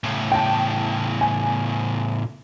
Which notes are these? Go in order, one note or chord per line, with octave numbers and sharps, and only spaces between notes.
A2 C#3
G5 A5
G#5